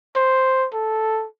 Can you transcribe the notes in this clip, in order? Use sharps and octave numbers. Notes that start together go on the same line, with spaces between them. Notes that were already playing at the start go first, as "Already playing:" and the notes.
C5
A4